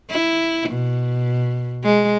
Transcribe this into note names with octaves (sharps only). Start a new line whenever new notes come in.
E4
B2
G#3